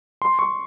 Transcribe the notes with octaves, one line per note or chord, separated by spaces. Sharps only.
C6
C#6